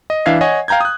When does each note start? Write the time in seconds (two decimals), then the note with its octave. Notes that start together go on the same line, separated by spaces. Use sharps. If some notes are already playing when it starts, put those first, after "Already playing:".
0.10 D#5
0.26 E3 D4 E5 F5 G#6 C7
0.41 C#5 D#5 F#5 G#5
0.68 F5 G5 A#5 G6 G#6
0.81 D#6 F#6